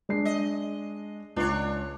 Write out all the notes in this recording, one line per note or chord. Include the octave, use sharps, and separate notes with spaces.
G#3 D4 C7
D#5
C#2 D4 C#5